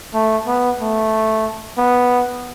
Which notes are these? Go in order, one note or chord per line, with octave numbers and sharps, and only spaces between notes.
A3
B3
A3
B3